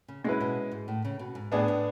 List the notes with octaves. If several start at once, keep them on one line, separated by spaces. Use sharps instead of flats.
C#3
B2 G#3 C#4 E4 B4
B2
G#2
A2
C#3
B2
G#2
A2 B3 D4 G#4
A2